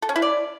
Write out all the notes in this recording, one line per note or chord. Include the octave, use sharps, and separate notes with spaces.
A4
C#4
E4
D5